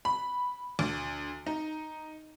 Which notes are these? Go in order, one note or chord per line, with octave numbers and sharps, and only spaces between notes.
B5
D2
D#4